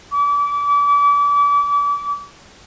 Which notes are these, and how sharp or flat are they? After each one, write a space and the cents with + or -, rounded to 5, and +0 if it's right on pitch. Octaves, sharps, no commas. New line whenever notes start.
D6 -35